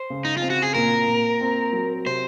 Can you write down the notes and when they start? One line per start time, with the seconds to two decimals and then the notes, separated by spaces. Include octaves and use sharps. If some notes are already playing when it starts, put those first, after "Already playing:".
Already playing: C5
0.10 C#3
0.25 D#4
0.37 C4 F4
0.50 F#4
0.63 G#4
0.74 A#2 A#4
1.07 A#2
1.41 C4
1.73 F#3
2.06 C3 C5